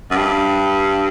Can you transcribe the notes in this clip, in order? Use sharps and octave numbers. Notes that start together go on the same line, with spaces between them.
F#2
G2